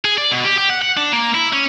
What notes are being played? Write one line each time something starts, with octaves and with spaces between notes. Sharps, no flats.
G#4
D5
B2
G4
G4
F#5
F#5
D4
A#3
E4
C#4